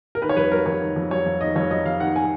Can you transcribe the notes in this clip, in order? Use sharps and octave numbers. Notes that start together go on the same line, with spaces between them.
A#4
D#3 B4
C#5
F2 B4
F#3 A#4
F2 C#5
D#3
F2
F#3 C#5
F2
D#3 D#5
F2 C#5
F#3 D#5
F2 F5
D#3 F#5
G#5